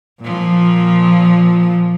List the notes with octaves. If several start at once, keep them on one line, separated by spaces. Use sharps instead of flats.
A#2 F3